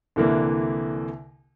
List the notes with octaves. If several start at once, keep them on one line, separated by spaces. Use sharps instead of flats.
C2 D3 E3 A#3